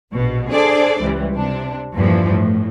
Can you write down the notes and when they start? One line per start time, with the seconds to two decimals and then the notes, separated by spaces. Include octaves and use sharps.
0.14 A#1 B2
0.51 D4 G#4 A4 C5 D5
1.01 C#2 E3 G3
1.34 C3 D4
1.94 E2 G2 A#2 E3 F3
2.30 A2